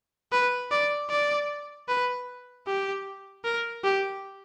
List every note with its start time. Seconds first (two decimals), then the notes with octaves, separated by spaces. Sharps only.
0.32 B4
0.72 D5
1.10 D5
1.89 B4
2.67 G4
3.45 A#4
3.84 G4